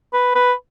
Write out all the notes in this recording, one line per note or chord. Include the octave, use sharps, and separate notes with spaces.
B4
B4